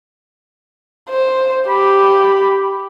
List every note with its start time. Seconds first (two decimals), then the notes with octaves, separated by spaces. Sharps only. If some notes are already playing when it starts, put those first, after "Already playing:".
1.10 C5
1.68 G4 B5